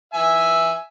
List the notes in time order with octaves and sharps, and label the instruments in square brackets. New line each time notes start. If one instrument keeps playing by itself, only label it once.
[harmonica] E5 G#5